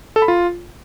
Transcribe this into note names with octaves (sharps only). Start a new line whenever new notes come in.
A4
B5
F4